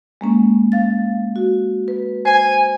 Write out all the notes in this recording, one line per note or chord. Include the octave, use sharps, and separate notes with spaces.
G#3 A#3 C#4
F5 A6
F#4
B4
C5 G#5